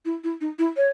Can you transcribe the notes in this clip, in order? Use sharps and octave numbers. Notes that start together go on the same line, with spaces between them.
E4
E4
D#4
E4
C#5